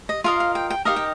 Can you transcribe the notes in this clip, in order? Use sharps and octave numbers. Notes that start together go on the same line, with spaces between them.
D#5
F4 A#4 D#5 F5
F5
G5
G5
D#4 G4 A#4 D#5 F5
G5